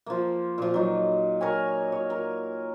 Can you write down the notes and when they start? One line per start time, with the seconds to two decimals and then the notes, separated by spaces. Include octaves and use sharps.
0.06 F3 A#3
0.58 A#2 F3
0.74 F#3 D#4
1.41 A#4 C#5 G#5
1.92 C#5
2.10 A#4